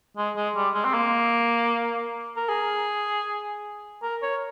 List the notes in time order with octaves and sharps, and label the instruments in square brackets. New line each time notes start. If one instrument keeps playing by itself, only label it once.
[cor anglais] G#3
G#3
G3
G#3
C4
A#3
A#4
G#4
A#4
C#5